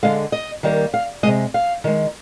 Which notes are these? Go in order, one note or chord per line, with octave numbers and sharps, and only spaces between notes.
D3 G#3 F5
D#5
D#3 G3 A#3
F5
C3 D#3 G#3 D#5
F5
D#3 G#3